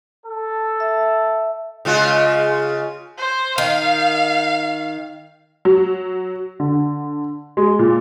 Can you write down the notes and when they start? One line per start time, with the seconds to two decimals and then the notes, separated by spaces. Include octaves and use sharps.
0.25 A4
0.80 E5
1.85 C#3 G#3 F4
3.19 C5
3.58 D#3 F5
5.65 F#3
6.60 D3
7.57 G#3
7.79 A#2